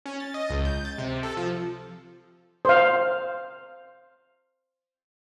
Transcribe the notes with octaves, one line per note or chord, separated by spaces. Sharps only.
C#4
A6
D#5
C#2
G6
A6
C3
A4
F3
C5 F5